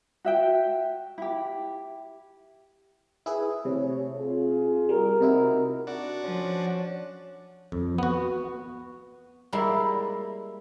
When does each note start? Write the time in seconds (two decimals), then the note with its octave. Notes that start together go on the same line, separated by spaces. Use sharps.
0.25 F#4 E5 G5
1.18 E4 G4
3.26 E4 G#4 B4
3.65 C3 A3 C#5
4.15 F4 G#4
4.89 G3 A#4
5.21 C3 D#4 E4 F#4
5.87 D4 F#4
6.23 F3 C#4
7.72 F2
7.98 B3 F#4
9.53 G3 G#3 A#3 E4